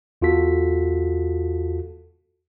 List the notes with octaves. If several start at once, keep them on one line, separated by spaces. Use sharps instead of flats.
E2 F4 F#4 A4 B6